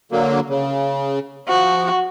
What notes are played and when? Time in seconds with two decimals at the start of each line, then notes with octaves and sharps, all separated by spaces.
0.12 D3 F#3 A#3
0.50 C#3
1.48 F3 F#4